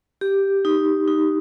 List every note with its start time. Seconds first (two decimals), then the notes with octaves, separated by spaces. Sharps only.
0.21 G4
0.65 D#4
1.08 D#4